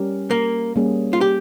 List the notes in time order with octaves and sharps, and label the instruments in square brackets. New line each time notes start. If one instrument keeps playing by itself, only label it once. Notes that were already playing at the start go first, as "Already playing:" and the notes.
Already playing: [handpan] G3 C#4 G4 A#4
[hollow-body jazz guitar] A#3
[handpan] G3 A#3 C#4 G#4
[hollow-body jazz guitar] F4
G4